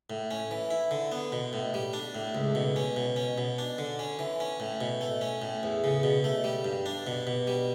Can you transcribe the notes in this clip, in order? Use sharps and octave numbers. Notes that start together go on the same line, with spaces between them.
A2
C#4
E3
E4
D3
B3
B2
A2
G3
D4
A2
C#2
B2
C#4
B2
C#4
B2
D4
D3
C#4
E3
C#4
A2
B2
A3
C#4
A2
E2
C#3
B2
A3
G3
G2
D4
B2
B2
G3